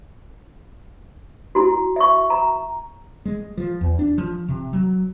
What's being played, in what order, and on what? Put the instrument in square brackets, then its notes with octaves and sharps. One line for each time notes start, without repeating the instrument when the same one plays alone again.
[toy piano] E4 F#4
E5 C#6
A#5
[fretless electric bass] G#3
F3
E2
D4
F3
C3
F#3